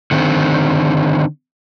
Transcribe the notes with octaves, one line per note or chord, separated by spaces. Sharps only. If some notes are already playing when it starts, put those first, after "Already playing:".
D3 D#3 C4